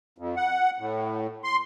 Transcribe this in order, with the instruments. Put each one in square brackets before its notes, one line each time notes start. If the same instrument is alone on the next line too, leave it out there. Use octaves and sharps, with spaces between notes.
[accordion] F2
F#5
A2
C6